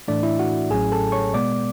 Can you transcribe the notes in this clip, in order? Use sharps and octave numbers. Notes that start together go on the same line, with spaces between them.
A2 E3 A3 D4 D5
E4 E5
F#4 F#5
A1 A2 F#3 C#4 G#4 G#5
A4 A5
C#5 C#6
B2 G#3 B3 D5 D6